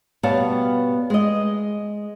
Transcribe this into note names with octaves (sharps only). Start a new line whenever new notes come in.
B2 G3 B3 C#5 F5 A5
G#3 D#5